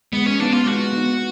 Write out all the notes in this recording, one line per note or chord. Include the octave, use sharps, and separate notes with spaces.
G#3 B3
C#4
B3 D4 D#4
F4
G#3 F#4
B3 D#4